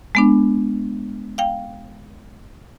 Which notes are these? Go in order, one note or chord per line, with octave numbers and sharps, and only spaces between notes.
G#3 B3 D4
F5 G5